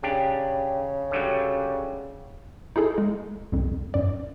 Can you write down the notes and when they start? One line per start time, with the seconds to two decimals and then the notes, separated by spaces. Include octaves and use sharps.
0.03 C#3 D4 G4
1.11 D3 F#3 G3
2.76 D#4 E4 G#4 A4
2.98 G#3
3.52 C2 F2
3.94 F#2 D5